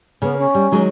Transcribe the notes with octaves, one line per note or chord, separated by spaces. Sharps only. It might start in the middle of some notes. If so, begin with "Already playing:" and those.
C#3 A#3 B3
C#4
G3
D#3 F#3 G#3